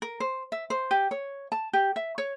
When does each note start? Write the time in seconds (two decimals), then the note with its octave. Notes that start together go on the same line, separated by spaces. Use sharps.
0.02 A#4
0.20 C5
0.52 E5
0.70 C5
0.91 G4
1.11 C#5
1.52 A5
1.73 G4
1.96 E5
2.18 C#5